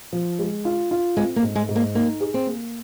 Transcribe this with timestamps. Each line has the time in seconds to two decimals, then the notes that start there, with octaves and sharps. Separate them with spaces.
0.13 F3
0.39 G#3
0.65 F4
0.91 F4
1.17 G#3 C4
1.36 A#3
1.43 G#2
1.55 G#3
1.69 G#2
1.76 A#3
1.95 A#3 D#4
2.20 G#4
2.34 C4
2.47 A#3